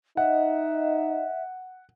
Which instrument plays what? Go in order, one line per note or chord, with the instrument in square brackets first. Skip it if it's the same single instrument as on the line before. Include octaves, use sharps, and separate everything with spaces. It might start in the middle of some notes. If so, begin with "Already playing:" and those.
[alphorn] D#4 [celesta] D#5 [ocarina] E5 [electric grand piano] F#5